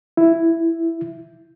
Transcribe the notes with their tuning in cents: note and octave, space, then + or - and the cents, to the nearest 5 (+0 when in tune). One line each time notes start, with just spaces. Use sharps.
E4 +5